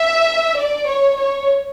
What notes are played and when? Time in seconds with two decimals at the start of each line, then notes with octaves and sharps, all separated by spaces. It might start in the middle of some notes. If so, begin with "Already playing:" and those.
Already playing: E5
0.57 D5
0.87 C#5
1.16 C#5